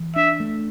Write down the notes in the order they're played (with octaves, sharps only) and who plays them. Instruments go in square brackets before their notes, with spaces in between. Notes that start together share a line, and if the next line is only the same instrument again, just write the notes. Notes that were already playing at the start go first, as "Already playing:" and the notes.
Already playing: [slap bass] E3
[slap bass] D4 [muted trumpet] E5
[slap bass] A3